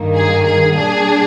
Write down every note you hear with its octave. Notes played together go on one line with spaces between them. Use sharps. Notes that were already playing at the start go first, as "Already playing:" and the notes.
Already playing: G2 D#3 A#3
G#4
G#4
A#2 G3 D4 G#4